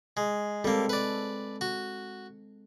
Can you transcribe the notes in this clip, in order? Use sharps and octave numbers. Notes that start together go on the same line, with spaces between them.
G#3
G3 G#3 A#3 C4 A4
B4 D5
F#4